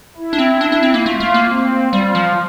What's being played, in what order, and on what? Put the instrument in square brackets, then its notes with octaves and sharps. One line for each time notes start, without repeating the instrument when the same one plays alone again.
[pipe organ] E4
[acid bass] D4
C4
D4
D4
C4
A#3
[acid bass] A3 [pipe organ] F4
[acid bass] A3
A#3
[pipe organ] C4
[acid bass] G3 [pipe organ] F4
[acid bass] F3